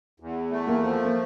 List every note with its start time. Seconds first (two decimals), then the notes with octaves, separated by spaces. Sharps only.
0.20 E2
0.51 A3
0.67 A#3
0.83 F3
1.05 A#3